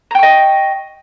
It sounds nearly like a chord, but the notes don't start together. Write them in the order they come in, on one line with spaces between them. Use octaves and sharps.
A#5 G5 C#6 D#5